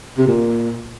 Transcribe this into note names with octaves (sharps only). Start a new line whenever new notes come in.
C3
A#2